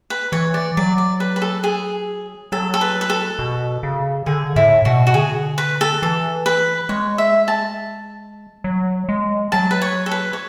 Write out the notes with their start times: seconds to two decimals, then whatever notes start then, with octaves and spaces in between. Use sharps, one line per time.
0.10 B4
0.32 E3 C#5
0.54 D5
0.77 F#3 D5
0.98 D5
1.20 B4
1.36 B4
1.42 A4
1.64 G#4
2.52 F#3 A4
2.74 A4
2.81 B4
3.01 B4
3.10 A4
3.39 B2
3.83 C#3
4.26 D3 G#4
4.56 A2 E4
4.85 B2 F#4
5.07 F#4
5.14 D3 G#4
5.58 B4
5.81 A4
6.02 E3 A4
6.46 B4
6.89 G#3 C#5
7.18 E5
7.48 A5
8.64 F#3
9.09 G#3
9.52 F#3 A5
9.71 B4
9.82 C#5
10.06 A4
10.11 B4
10.33 C#5